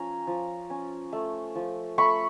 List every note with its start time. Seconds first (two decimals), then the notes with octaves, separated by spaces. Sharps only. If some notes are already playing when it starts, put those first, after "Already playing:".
Already playing: F3 C#4 A#5
0.27 F3
0.70 C#4
1.13 A3
1.55 F3
1.98 A3 B5 C#6